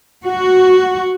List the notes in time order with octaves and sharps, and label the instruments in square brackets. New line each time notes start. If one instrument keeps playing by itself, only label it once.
[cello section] F#4